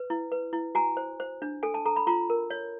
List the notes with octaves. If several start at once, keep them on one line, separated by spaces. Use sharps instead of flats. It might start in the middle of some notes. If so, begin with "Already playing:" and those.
Already playing: B4
E4
B4
E4
F#4 G#5 A#5
C5
C5
D4
A4 G#5
A5
A4 A#5
B5
F4 A#5 C6
A#4
C#5